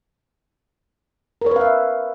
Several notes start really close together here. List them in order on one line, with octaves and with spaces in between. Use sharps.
A#4 C#5 B4 F5 E5